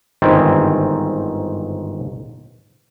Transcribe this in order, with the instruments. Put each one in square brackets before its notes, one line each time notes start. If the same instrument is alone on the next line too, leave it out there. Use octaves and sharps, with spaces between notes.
[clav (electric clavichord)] G1 G#2 D#3 C4 E4 D5